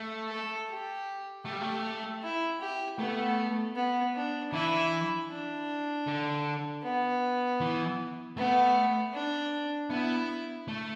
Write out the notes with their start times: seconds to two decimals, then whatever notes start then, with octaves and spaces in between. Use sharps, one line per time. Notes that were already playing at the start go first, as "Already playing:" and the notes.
Already playing: A3
0.30 A4
0.69 G4
1.46 A3 G4
1.54 G3
1.62 A3
2.23 E4
2.61 G4
2.99 A3 B3
3.76 B3
4.15 D4
4.53 E3 E4
5.30 D4
6.07 D3
6.84 B3
7.61 E3
8.37 A3 B3
9.14 D4
9.90 B3 E4
10.68 A3